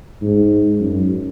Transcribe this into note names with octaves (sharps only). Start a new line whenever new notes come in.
G#2
F#2